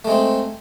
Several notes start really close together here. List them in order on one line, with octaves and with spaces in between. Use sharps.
A3 G#3 C4